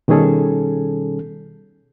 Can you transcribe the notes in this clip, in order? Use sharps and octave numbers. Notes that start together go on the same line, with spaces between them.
B2 D#3 G3 C#4 G#4 A4